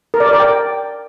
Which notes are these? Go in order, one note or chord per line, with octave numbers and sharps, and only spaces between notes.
A#4
D5
A#4
D5
G5